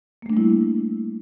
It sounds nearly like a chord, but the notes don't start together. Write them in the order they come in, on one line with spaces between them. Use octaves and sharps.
A#3 A3 D4 G3 E4